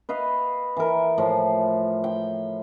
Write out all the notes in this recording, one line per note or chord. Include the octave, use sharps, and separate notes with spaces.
B4 D#5 F5
E3 A#4
A2 F3
G5